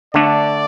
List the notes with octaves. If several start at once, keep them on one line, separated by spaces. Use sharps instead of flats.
D3 A3 D4 D5